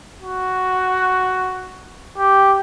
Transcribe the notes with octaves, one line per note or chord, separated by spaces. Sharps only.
F#4
G4